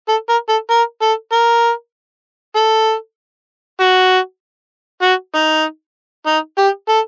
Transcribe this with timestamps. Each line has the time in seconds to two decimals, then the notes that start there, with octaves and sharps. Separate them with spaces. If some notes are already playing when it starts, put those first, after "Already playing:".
0.09 A4
0.29 A#4
0.49 A4
0.71 A#4
1.02 A4
1.32 A#4
2.56 A4
3.80 F#4
5.03 F#4
5.35 D#4
6.27 D#4
6.58 G4
6.89 A4